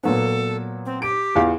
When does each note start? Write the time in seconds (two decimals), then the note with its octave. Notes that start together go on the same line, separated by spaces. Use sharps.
0.03 A#2 F#3 B3 A4
0.85 C4
1.02 G4 D7
1.35 E2 F4 F5